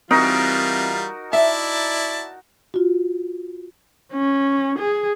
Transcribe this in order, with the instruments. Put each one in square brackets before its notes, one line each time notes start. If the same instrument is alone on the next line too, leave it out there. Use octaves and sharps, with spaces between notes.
[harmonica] E3 G3 F4 [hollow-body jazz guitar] C4 [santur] D#4 F#4 A#4
[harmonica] E4 D5 A5 [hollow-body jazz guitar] E5
[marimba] F4 F#4
[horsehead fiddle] C#4
G#4